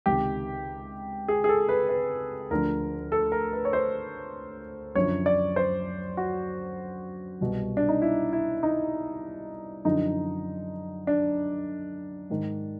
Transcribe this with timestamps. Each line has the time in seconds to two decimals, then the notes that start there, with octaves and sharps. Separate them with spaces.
0.06 C#2 C3 D#3 G4
1.28 G#4
1.44 G#4
1.49 A4
1.69 B4
1.89 B4
2.50 D2 D3 F3 A#4
3.12 A4
3.32 A#4
3.53 B4
3.65 C#5
3.73 C5
4.95 F#2 D3 F3 C#5
5.26 D5
5.56 C5
6.17 F#4
7.41 C2 B2
7.77 D4
7.89 D#4
8.02 E4
8.33 E4
8.63 D#4
9.84 F#2 D3 F3 D#4
11.07 D4
12.30 G#2 D#3